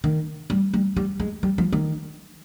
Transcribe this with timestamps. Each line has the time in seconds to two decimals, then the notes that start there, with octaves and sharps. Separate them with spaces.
0.04 D#3
0.50 G3
0.74 G3
0.96 G3
1.20 G#3
1.43 G3
1.58 F3
1.72 D#3